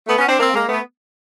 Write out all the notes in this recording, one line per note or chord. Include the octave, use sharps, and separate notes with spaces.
A3 B3
B3 C#4
C4 D4
A#3 C4
G#3 A#3
A3 B3